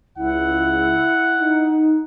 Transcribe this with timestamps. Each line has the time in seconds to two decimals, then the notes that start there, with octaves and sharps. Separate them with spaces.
0.17 C#2 E4 F#5
1.40 D#4